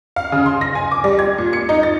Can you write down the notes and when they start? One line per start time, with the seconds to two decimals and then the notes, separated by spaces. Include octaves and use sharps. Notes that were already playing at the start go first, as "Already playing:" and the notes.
0.16 F5
0.32 C#3
0.46 C6
0.61 A#6
0.75 G#5
0.91 D6
1.04 G3
1.19 G#6
1.38 A#2
1.53 C#7
1.69 D#4
1.83 A6